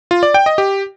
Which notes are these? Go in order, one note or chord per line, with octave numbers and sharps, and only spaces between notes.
F4
D5
G5
D#5
G4